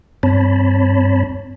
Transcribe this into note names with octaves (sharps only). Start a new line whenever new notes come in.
G2 C4 C#5 A5 B5